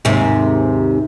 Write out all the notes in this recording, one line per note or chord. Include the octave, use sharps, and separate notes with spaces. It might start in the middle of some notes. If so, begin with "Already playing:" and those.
D#2 G#2 C3